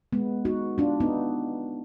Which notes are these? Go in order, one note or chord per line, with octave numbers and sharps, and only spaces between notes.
G#3 B3
D#4 F#4
D4 F4
B3 D#4